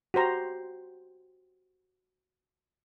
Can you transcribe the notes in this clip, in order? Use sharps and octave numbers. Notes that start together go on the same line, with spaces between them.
F#4 G4 C5 A#5